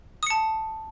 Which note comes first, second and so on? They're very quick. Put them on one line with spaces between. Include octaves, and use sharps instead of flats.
D#6 C#7 A5